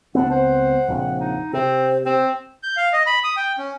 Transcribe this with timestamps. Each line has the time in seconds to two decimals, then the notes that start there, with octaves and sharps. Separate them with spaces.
0.15 C#2 B3 C4 D4 F#5
0.31 C5 F#5
0.88 A#1 F2 C#3
1.20 D#4
1.53 C3 C4 C5
2.05 C4 C5
2.63 G6
2.77 F5
2.93 D#5
3.07 B5
3.24 D#6
3.37 G5
3.58 C#4